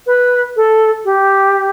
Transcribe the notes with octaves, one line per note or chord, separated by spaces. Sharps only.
B4
A4
G4